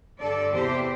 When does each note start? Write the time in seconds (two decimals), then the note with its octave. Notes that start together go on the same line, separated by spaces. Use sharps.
0.19 G2 D3 A4 D5
0.52 E2 C3 E3 G4 C5